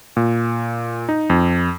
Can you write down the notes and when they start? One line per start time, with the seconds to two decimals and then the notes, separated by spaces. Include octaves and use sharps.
0.17 A#2
1.09 D#4
1.30 F2